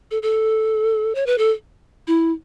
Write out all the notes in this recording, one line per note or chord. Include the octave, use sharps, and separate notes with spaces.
A4
A4
C#5
B4
A4
E4